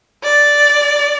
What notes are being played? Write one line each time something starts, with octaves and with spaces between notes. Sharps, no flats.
D5